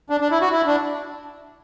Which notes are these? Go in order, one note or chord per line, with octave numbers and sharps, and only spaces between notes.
D4
D4
E4
F#4
E4
D4